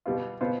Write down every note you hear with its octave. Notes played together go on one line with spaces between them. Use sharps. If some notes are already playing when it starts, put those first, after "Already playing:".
B2 G3 B3 F4
B2 B3 F4 C5